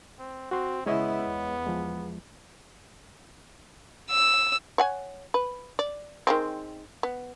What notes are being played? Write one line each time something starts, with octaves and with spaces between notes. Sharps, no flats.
C4
C4 F#4 C6
C#3 G#3 B3 E4 C#5 D#5
E2
F3 G#3
E6
C#5 F#5 G#5
B4
D5
D#3 G#3 C4
B3